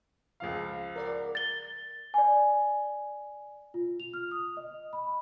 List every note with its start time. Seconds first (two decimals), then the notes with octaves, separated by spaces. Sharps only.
0.40 C#2 F3 F5
0.96 A#4 D5 F#5
1.35 A6 G7
2.14 D5 G#5
3.74 F4
4.00 F7
4.14 F6
4.31 D#6
4.57 D#5
4.93 B5